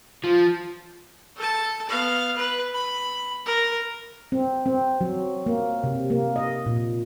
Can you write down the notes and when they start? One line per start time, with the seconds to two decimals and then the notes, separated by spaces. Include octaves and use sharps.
0.24 F3
1.36 A4 A5
1.89 B3 F5
2.37 B4
2.74 B5
3.46 A#4
4.32 C4
4.66 C4
5.01 F#3
5.46 A#3
5.84 C3
6.10 A#3
6.36 D#5
6.66 A#2